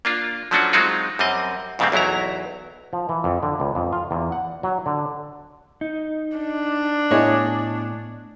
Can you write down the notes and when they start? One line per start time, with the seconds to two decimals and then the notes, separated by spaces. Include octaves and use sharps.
0.05 A#3 D4 F4
0.51 F3 F#3 A3 C#4 D4 F#4
0.73 F#3 G#3 C4 D#4 F4 F#4
1.19 F#2 G3 C4 D#5
1.79 F2 G#2 C#3 A3 A#3 C4
1.92 B1 E2 F#3 E4 A#5
2.93 F3
3.09 E3
3.24 F2
3.43 D3
3.60 C#2
3.75 F2
3.93 F4
4.11 E2
4.32 F#5
4.63 F#3
4.86 D3
5.81 D#4
6.37 D4
7.11 A2 B3 E4 C#5 D#5 G#5